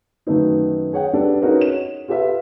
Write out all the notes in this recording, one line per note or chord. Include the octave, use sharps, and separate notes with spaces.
F#2 D#3 A3 B3 D#4
G#4 C#5 F#5 G5
G3 B3 D4 A4
B3 C#4 D#4 F#4 G#4 A#4
C#5 E7
F4 G4 A4 B4 E5 F5